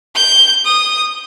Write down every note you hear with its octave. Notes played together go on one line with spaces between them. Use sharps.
G6
D#6